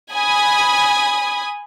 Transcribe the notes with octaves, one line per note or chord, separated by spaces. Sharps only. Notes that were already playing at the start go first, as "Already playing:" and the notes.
G#5 B5 D#6